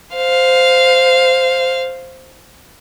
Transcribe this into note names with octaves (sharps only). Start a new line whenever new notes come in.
C5 F5